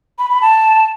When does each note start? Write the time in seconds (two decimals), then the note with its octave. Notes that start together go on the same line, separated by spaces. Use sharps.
0.19 B5
0.30 B5
0.42 A5